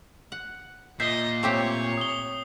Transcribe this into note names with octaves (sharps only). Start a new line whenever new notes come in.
F#5
A#2 D#5 E5 G6 C7
A3 C4 G4 C#5
D#6 G7